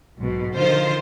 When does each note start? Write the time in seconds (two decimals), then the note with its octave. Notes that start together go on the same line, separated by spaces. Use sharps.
0.17 B1 G#2 B2
0.54 D3 D#3 F3 F4 C5